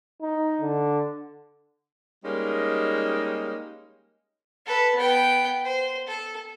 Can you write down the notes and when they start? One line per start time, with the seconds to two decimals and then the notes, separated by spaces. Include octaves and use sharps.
0.22 D#4
0.61 D3
2.24 G3 G#3 A#3 C#4 D#4
4.66 A4 B4
4.95 B3 G5
5.64 C5
6.07 A4